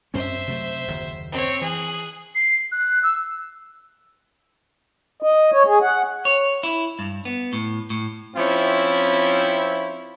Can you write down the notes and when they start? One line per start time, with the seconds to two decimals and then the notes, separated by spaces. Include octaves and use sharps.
0.14 F#2 C4 C#4 C5 E5
0.48 C3 F#3 A3
0.88 F#1 D#2
1.32 C4 C#5
1.62 E3 G#4 F#6
2.35 C7
2.72 F#6
3.03 E6
5.22 D#5
5.53 C#5
5.66 G#4
5.82 F#5
6.25 C#5
6.63 E4
6.99 G2
7.25 B3
7.53 A2
7.90 A2
8.36 F3 C4 C#4 E4